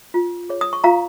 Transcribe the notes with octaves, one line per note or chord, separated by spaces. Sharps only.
F4
G#4 C#5
D#6
C#6
F4 F5 A#5